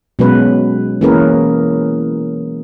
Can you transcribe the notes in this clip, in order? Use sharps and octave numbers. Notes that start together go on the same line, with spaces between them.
B2 F#3 G#3 C#4 B4
E3 A#3 C#4 G#4 A#4 B4